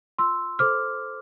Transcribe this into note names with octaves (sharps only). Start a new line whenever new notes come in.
F4 C6 E6
A4 C5 D6 F6